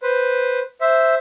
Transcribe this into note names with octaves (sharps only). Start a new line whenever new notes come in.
B4 C5
C5 E5